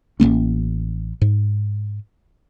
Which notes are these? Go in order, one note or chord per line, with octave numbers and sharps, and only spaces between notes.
A1 F3 A#3 C#4
G#2